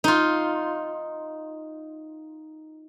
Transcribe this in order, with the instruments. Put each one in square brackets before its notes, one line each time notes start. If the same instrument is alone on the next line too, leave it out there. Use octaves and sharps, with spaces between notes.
[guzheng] D#4 F4